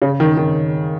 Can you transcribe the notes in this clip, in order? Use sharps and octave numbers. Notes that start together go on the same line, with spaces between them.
C#3
D#3
D#3